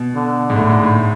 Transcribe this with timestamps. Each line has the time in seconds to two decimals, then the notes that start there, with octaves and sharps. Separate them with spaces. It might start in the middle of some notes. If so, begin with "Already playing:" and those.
Already playing: B2
0.15 D3
0.50 G#2
0.56 A2 D3
0.69 G#2
0.83 A2